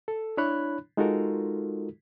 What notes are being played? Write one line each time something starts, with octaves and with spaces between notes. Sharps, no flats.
A4
D4 E4 C#5 B5 F#6
G#3 D#4 F4 F#4 A4 A#4